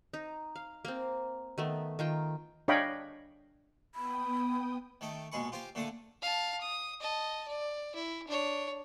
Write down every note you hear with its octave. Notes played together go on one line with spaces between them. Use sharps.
D#4
F5
A#3 C4
D#3 A3 B3
D#3 F4 G5
D4 C#5 D#5 F5 G5 B5
B3 G5 B5 D#6
D#3 A3 D#5 G5
A#1 B2 G#3 G#4 B5 C#6
F4 G4 C5 G5 G#5
A#2 D3 A3 D4 A4 D#6
F5 A5
D#6
D#5 A5
D5
E4
D4 C#5